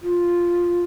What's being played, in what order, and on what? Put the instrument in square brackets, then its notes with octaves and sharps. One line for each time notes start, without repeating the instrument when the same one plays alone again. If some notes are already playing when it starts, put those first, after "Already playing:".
[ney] F4